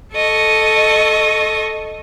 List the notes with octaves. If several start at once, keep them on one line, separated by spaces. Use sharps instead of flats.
A4 D#5 C#6